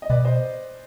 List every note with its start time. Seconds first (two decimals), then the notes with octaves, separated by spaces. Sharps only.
0.02 D#5
0.09 B2 B4 D5
0.25 C5 D#5